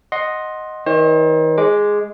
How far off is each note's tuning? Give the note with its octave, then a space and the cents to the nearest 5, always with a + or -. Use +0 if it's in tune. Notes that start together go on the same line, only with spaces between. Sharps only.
D#5 +0 F#5 +0 C6 +10
D#3 +40 C5 +40 D#5 -40
G#3 +0 D6 +0